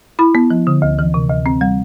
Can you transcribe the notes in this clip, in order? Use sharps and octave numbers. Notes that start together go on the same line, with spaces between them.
E4 B5
B3
F3
D3
D2
E3
C3
D2
C4
G3